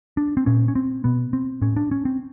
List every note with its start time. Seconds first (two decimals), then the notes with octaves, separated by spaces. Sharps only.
0.17 D4
0.37 C4
0.46 A#2 C#4
0.68 C#4
0.75 C4
1.04 B2 B3
1.33 C4
1.62 A2 C#4
1.76 D4
1.91 C#4
2.05 C4